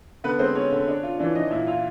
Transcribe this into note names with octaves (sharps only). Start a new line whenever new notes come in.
D3 B3 B4
G#3 C4 C5
G#3 C#4 C#5
D3
D4
F4
E3 D4 D5
E3 D#4 D#5
A#2 E4 E5
E4 F4 F5